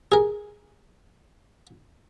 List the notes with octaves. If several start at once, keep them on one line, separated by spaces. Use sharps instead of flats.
G#4 A#4